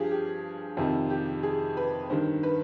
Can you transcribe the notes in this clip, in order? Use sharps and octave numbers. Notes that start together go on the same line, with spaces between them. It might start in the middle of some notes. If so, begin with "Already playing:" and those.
Already playing: G2 F3 G4 G#4
G4
F2 C3 D#3
G4
G#4
B4
G2 D#3 C5
B4